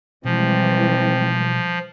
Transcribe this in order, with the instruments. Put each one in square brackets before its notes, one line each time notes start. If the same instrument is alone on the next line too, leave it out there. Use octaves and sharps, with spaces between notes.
[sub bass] B2 [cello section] E3 G3 G#3 [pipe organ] F3 [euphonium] C4